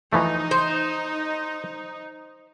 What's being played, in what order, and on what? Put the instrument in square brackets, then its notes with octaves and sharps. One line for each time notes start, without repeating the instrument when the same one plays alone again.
[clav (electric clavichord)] E3 F3 A3 [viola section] D#4
[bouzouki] C5